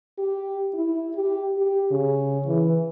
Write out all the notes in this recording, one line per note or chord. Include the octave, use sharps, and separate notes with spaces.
G4
E4
G4
G4
C#3
E3